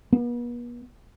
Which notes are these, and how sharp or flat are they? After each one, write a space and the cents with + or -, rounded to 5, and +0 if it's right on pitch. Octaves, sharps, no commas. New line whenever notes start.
B3 -40